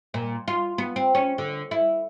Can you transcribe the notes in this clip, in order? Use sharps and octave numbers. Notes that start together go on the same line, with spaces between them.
A#2
F4
B3
C4
C#4
D3
E4